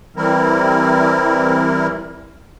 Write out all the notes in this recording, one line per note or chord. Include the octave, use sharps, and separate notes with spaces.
E3 G3 C4 E4 A#4